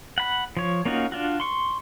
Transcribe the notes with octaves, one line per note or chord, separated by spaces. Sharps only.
F#5 B5
F3 C#5
A#3 C#4 D#4 F4 F#4
D4 F4 F#4
C6 C#6